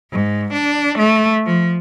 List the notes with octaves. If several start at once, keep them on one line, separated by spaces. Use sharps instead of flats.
G#2
D4
A3
F3